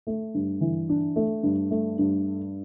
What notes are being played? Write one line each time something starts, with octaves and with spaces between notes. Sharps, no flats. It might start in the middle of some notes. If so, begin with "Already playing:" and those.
A3
G2
E3
D4
A3
G2
A3
G2